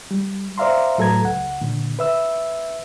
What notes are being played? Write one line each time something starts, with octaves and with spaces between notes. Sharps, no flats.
G3
C5 D5 E5 F5 A#5 C6
A2 F#3 A4 B4 A#5 G#6
C#2 F#5
A#2 D3
B4 E5 E6